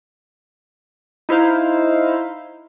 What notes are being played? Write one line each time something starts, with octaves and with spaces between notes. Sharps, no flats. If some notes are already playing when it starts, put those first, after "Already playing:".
D#4 E4 C5 F5